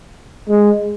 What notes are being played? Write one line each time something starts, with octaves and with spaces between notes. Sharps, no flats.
G#3